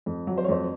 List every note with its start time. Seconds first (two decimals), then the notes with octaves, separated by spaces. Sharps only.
0.06 F2
0.27 F#3
0.38 C5
0.44 C#5
0.48 F2 C5